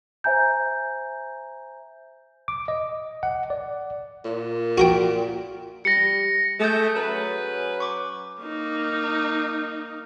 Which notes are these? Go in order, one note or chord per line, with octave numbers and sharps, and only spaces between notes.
C5 E5 G#5 A#5 G6
D6
D#5
F#5
D5
A#2
F#4 A#4 G5
G3 A#6 C#7
A3 G#4 D#6 G6
F#3 C#4 B4
C#6 D6
A#3 D#4